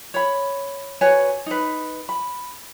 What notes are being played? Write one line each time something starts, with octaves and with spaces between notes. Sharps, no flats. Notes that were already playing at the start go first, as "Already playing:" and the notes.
C#5 B5
F#4 B4 C#5 G#5
D#4 B4
B5